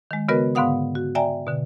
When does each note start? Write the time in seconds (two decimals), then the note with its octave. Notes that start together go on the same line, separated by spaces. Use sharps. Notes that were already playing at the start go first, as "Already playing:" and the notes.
0.11 D#3 G#3
0.28 C#3 B3 F#4 A#4 B4 D#5
0.55 G#2 D3 B3 F5 F#5 D#6
0.95 F#4
1.15 D5 E5 G5 G#5 A#5
1.47 B2 D3